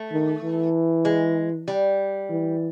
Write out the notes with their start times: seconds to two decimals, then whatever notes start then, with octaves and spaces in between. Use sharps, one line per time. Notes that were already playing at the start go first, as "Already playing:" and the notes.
Already playing: A3
0.12 D#3
0.44 E3
1.05 G#3
1.68 G3
2.30 E3